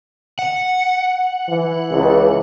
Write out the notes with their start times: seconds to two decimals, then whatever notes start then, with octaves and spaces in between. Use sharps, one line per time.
0.39 F#5
1.49 E3
1.91 C#2